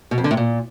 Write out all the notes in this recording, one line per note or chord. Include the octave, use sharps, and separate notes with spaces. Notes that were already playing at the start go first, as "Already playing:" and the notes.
B2
F2
D3
A2
A#2